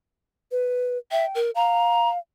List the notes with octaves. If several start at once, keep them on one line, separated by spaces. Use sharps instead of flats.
B4
E5 G5
A#4
F5 A#5